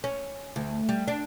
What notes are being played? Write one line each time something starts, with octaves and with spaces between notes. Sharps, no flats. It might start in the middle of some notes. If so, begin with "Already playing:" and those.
C#4
D2
G3
D4